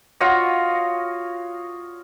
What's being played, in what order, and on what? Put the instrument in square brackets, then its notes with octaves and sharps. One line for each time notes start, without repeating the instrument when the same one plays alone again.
[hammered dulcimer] F4 F#4 C#5 D#5